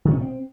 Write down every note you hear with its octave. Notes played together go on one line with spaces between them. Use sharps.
D#3
C#4
B2
C4